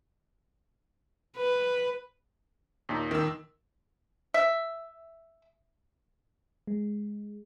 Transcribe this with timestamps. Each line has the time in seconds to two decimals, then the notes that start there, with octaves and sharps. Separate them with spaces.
1.37 B4
2.89 D#2 A#2 D#4
3.11 D#3 E6
4.34 E5
6.67 G#3